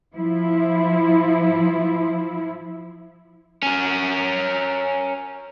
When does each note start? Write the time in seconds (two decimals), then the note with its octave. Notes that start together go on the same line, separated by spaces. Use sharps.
0.16 F3 E4
3.63 C#4 A#4